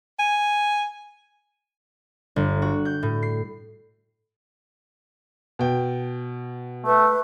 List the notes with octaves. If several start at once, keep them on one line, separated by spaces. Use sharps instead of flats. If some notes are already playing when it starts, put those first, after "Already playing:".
G#5
G1
F#4
G6
A2
C7
B2 G5
A3 B4